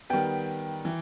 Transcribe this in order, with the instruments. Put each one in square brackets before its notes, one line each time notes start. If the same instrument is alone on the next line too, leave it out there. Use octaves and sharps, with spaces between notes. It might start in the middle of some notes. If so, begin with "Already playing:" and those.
[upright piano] D#3 G3 B3 G5
E3